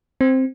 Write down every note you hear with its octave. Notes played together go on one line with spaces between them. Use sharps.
C4